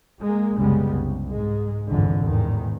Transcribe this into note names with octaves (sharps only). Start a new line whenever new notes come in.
G#3 A#3
F#1 C2 C#3 G3 G#3 B3
C2
G#2 G#3
G1 C2 F2 G#2 D3 E3
A1 E2 G#2 D#3